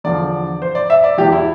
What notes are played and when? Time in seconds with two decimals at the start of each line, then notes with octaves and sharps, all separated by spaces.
0.04 E2 D3 F3 D5
0.62 C5
0.75 D5
0.90 E5
1.04 D5
1.18 E2 E3 G4
1.32 E4